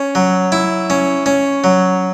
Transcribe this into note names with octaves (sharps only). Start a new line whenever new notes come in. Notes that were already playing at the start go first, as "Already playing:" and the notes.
Already playing: C#4
F#3
E4
C#4
C#4
F#3